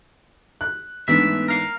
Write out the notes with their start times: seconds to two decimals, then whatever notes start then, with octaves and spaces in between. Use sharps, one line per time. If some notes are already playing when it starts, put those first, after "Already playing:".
0.61 F#6
1.08 G#2 E3 A3 B3 D4 E5
1.48 A#4 F5